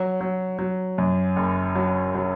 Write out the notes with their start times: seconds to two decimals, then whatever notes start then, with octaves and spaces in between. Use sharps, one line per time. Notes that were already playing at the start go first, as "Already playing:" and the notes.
Already playing: F#3
0.21 F#3
0.59 F#3
0.98 F#2
1.36 F#1
1.75 F#3
2.15 F#3